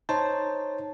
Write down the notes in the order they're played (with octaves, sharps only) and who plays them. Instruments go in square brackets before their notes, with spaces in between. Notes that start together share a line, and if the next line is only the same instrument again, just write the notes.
[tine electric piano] D#4 C5 C#5 A5